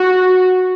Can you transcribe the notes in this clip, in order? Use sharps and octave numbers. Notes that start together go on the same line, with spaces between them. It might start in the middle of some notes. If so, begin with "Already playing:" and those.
Already playing: F#4